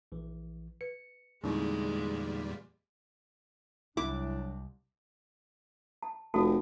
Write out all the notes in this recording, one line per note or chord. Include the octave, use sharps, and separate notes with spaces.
A#1 E3
B4 C#7
E2 A#2 D3 G3 G#3 C4 D#4 E4
C2 F#3 D4 E4 D6
A5
F1 F#4 A4 A5